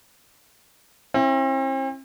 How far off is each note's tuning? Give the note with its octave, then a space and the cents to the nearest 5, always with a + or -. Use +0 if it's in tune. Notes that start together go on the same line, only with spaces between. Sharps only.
C4 +45 E4 +0